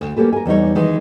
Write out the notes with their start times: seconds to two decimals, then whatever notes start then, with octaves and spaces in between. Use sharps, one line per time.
0.01 D2
0.16 A#3 C#4 G4 A4 B4
0.33 A#4 G#5
0.46 E2 G3 D#4 C#5
0.75 D#3 E3 G#3